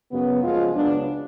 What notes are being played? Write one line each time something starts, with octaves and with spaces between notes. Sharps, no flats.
F#2 C#3 F#3 B3
F#1 F#2 F3 G#3 F4
C#2 C#3 F#3 B3 D4